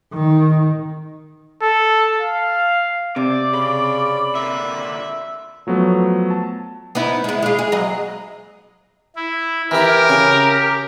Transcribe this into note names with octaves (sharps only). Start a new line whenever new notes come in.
D#3
A4
F5
C3 D5
C#3 B5
A#2 D3 E5
F3 F#3 A3 B3
A5
B3 D#4 E4
G#3 E4
G#3 F4
G#4
F#3 D#5
E4
E3 E4 G4 A#4
C#3